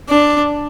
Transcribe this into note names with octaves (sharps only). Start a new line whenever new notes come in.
D4